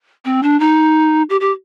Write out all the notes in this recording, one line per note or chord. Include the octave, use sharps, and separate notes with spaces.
C4
D4
D#4
G4
G4